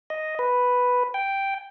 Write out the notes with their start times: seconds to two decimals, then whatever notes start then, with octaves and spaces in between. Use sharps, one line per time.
0.10 D#5
0.39 B4
1.14 G5